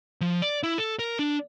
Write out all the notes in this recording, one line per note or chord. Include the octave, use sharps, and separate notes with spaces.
F3
D5
E4
A4
A#4
D4